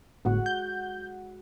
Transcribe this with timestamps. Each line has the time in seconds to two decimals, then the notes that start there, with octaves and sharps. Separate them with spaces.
0.25 G1 A2 G#3 F#4 F#5
0.46 G6